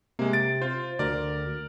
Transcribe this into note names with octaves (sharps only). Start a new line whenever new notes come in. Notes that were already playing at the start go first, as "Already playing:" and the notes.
C3 G#3 A#3
A6 D7
F4 C5
D2 A#4 D5